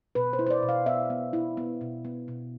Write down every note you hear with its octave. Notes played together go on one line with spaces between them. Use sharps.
B2 B4
C5
E4
C5
D5
B2
F5
B3 E5
B3
E4
B3
B2
B3
B2